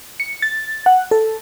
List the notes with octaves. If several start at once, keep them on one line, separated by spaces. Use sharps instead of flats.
C#7
A6
F#5
A4